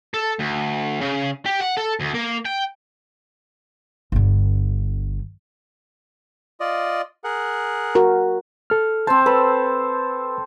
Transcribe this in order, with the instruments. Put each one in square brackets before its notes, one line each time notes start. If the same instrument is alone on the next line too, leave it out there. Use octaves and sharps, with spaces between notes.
[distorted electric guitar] A4
D2
C#3
G4
F#5
A4
D2
A#3
G5
[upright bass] G1 D3
[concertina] F4 D5 D#5
G#4 A#4 F#5
[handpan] F#4 A#4
[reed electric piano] A4 F6
[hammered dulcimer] C4 C5 [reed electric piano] A5
[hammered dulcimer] A4 [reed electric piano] B4 B5